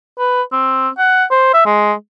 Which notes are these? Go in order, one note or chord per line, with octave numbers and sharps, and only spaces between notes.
B4
C4
F#5
C5
E5
G#3